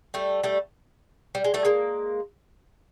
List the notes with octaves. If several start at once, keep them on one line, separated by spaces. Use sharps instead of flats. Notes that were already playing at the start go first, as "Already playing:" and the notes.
G3 A3
G3 A3
G3
G#3
G3 A3
G#3 A#3